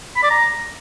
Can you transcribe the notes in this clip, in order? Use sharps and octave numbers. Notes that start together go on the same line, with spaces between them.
B5
D5
A#5